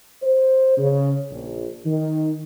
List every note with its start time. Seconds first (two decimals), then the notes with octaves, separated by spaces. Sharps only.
0.22 C5
0.77 C#3
1.30 A#1
1.85 D#3